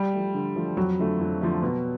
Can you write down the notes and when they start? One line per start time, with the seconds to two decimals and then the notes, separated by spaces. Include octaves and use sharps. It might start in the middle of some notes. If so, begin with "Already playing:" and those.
Already playing: G3
0.13 F3 A3
0.34 D3
0.56 F3 A3
0.77 F2 F#3
0.99 D3 F3 A3
1.20 F2
1.41 D3 F3 A3
1.63 B2